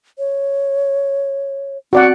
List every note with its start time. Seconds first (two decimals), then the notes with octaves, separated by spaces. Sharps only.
0.18 C#5
1.93 C4 F#4 D5 F#5